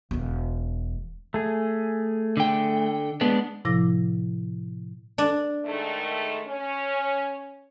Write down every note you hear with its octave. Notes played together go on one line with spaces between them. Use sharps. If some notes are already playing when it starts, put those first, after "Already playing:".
E1 E2
A3 G#4
D3 G5
G#3 B3 D4
A2 C3 F3 E4 D6 A#6
D4
G#2 D#3 A3
C#4